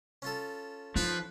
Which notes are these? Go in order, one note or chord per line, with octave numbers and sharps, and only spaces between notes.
C#4 F4 A4
F3 D#4 B4